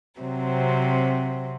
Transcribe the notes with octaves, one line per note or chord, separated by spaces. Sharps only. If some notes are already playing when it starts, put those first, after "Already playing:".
C3 F#3 C4